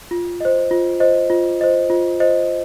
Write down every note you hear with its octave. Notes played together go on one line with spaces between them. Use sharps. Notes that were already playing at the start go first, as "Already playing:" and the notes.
F4
C5 D#5
F4
C5 D#5
F4
C5 D#5
F4
C5 D#5